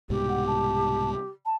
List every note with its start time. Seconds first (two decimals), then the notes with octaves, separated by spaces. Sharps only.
0.10 C2 G#2 B2 G4
0.29 F#5
0.47 A5
1.45 A5